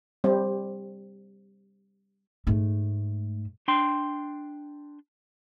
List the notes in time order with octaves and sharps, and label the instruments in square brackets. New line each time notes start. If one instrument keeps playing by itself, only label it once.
[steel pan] G3 C4
[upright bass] G#2 A3
[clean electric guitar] D4 G5 C6